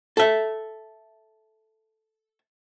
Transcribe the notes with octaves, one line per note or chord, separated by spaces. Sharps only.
A4 E5